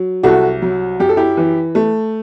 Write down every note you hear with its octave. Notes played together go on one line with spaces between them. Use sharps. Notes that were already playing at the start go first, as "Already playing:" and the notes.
Already playing: F#3
C2 F#4 A4
F#3
F#2 G4
A4
E4 G4
E3
A3